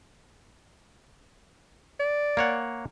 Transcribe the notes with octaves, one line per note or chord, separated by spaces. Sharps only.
D5
A#3 C#5 F#5